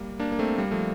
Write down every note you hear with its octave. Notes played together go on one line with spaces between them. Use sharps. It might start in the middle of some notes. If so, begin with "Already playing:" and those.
Already playing: G3 A#3
A#3 D4
A#3
A3 C4
G3 A#3
F3 A3